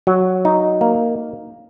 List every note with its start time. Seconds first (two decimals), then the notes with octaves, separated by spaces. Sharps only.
0.07 F#3
0.45 D#4
0.81 A#3